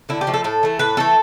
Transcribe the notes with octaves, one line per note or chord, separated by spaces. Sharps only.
D3 E4
G4
F3 A3
A4
A2 A4
E3 A3
A2 B4
E3 A3 A4